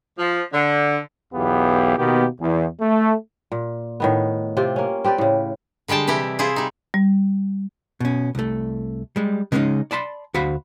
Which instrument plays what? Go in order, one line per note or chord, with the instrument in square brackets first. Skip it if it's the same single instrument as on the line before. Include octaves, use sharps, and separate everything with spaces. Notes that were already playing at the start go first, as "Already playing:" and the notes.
[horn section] F3
D3
[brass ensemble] B1 E2 B3 G4 F5
B2 D#3 A#3 B3 G4
E2
A3
[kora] A#2
A2 D#3 B3
C3 C4 F4 G4
A#3 C#4
C4 G4 B4 D5
A2 C#3
[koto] D3 G3 G#3 G5 A5
C3 E3 E4 G4
E4 F4 G#4 C5
G3 D#4
[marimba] G3
[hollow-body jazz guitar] B2 C#4
C2 A3
G3 G#3
C#3 G#3 A#3 B3 C#4 D#4
D5 A5 B5 C6
D2 F#4 C5 F5 B5